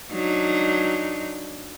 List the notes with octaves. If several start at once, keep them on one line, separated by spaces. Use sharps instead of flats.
F#3 D4 D#4